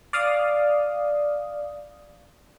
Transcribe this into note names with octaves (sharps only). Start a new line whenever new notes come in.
D5 F5 D#6